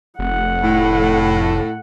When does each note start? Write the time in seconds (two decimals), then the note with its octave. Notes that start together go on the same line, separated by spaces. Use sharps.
0.19 F1 A3 F#5
0.63 A2